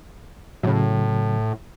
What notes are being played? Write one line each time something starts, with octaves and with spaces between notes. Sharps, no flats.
A2 C#3 F#3